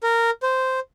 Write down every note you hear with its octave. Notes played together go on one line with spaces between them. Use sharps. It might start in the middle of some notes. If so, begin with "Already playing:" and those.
A#4
C5